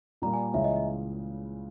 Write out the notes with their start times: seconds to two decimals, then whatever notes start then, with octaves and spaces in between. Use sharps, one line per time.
0.22 A#2 G3 A#3 A#5
0.34 G#5
0.54 C#2 C#3 E3 E5
0.64 D#5
0.76 D#5